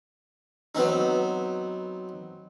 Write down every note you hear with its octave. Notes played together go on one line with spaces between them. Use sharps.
F#3 B3 C4 D#4